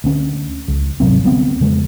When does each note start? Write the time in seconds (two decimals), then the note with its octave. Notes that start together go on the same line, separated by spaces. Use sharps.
0.04 D2 C#4
0.68 C#2
1.00 G#1 C3 F#3 C4
1.24 D2 G3 B3 C4
1.60 F2 C#3 G#3